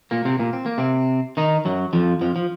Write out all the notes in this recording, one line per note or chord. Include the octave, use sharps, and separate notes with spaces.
A#2 A#3
C3 C4
A#2 A#3
C4
A#3
C3 C4
D#3 D#4
F#2 F#3
F2 F3
F2 F3
F3